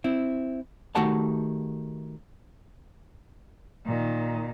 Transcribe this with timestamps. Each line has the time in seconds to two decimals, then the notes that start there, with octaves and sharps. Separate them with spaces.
0.04 C4 E4
0.95 D#3 A3 F#4 G4 F#5 A5
3.86 A#2 D#3